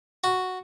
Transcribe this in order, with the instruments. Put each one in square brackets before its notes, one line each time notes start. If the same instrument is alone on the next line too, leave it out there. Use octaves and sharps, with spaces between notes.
[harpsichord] F#4